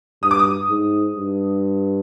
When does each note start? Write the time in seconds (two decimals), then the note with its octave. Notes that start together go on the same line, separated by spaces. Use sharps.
0.22 G2 D#6
0.31 D6
0.39 D#6
0.69 G#2
1.17 G2